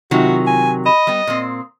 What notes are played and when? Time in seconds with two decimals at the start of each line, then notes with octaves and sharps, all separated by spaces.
0.11 C3 D#3 F#3 F4 F#4
0.47 G#5
0.86 D#5 B5
1.07 G3 B3 D#6
1.27 A#2 C4